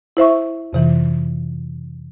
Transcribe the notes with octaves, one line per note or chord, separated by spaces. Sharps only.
E4 C5 E5 C#6
F2 C3 E3